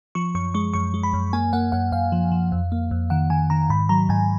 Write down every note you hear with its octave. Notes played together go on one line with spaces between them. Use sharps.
F3 C#6
F#2 C#6
G#3 C#6
F#2 C#6
G#3
B5
F#2
A#3 G#5
A#3 F#5
F#2 F#5
F#2 F5
F3
F3
F2
A#3
F2
D#3 F#5
D#3 G#5
D#3 A#5
G#2 B5
F#3 A#5
G#2 G#5